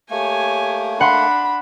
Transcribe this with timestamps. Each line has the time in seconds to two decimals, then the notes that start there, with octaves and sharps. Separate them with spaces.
0.10 A3 A#3 G4 C#5 G#5
1.01 D4 F#5 B5 C6